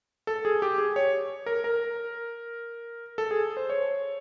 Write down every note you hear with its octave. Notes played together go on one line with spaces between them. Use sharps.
A4
G#4
G4
G#4
C#5
A#4
A#4
A4
G#4
C5
C#5